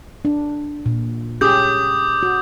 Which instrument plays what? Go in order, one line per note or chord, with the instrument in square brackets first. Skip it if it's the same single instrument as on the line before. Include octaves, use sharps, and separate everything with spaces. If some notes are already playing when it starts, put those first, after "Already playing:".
[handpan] D4
A#2
[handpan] C#4 G4 G#4 [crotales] D6 D#6 G6
[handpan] F#4